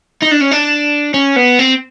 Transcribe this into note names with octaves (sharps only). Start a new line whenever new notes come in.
D#4
D4
C#4
D4
C#4
B3
C4